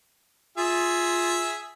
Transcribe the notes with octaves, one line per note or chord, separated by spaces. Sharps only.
F4 G#4 E5